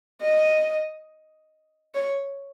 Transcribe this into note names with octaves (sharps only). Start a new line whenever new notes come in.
D#5
C#5